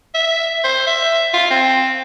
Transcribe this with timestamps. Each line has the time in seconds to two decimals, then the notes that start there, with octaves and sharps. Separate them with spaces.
0.14 E5
0.64 C5
0.87 E5
1.34 F4
1.50 C4